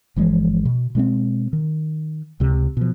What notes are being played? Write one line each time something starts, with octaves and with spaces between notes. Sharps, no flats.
G1 E3 F3 G#3
B2
B2 G#3 B3 C4
D#3
C#2 C3
B2 F3